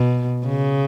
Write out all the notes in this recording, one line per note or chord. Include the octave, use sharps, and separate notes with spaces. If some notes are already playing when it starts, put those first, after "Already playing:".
Already playing: B2
C#3